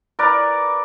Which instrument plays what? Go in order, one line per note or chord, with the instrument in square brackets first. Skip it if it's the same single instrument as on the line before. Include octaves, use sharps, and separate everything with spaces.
[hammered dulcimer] A#4 B4 D5